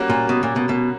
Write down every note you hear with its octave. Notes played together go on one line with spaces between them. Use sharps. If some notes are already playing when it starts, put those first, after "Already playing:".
Already playing: G3 A#3 C#4 F#4
A#2
B2
A#2
B2
B2